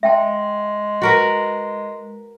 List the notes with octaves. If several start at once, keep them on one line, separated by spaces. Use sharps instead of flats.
G#3 E5 G5 A5
F#4 A#4 B4